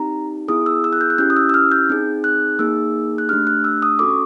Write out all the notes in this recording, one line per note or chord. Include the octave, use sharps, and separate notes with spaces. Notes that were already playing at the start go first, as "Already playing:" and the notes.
Already playing: C4 D#4 G4 A#5
B3 E4 G#4 D#6
E6
E6
F#6
G6
F#6
C#4 E4 G4 G6
D#6
E6
E6
F6
G6
C4 D#4 G#4
F#6
A#3 D#4 G#4 E6
F#6
A3 D4 G4 F6
F#6
E6
D#6
C#4 F#4 A4 D6
C#6